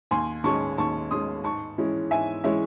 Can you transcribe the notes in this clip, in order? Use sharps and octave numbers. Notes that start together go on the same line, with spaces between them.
D#2 G#5 C6
D#3 G#3 C#4 A5 C#6
D#2 A5 C#6
D#3 G#3 C#4 C6 D#6
G#2 A5 C#6
E3 G#3 C#4 E4
G#2 E5 G#5
E3 G#3 C#4 E4 C#5 E5